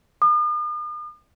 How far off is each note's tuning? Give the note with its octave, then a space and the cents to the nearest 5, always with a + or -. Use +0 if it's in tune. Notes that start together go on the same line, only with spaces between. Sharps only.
D#6 -45